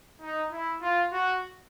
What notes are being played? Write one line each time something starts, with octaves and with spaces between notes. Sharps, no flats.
D#4
E4
F4
F#4